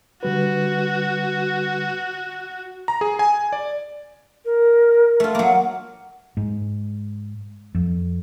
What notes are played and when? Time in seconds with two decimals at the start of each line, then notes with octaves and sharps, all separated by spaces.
0.23 D3 G3 F#4 B4
2.88 A#5
3.01 G#4
3.19 G#5
3.53 D5
4.45 A#4
5.20 A3 F4
5.35 F#3 A#3
6.37 G#2
7.75 F2